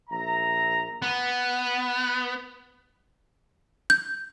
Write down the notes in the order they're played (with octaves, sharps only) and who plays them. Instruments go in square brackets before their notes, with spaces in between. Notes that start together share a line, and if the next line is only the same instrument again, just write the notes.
[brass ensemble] A#1 E5 A#5
[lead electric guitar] B3
[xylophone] G6